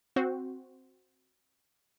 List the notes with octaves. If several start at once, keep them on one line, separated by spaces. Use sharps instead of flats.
C4 F#4 C5